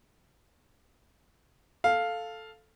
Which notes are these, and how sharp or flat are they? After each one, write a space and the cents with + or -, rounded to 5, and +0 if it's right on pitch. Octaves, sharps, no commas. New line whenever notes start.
A4 +0 F5 +0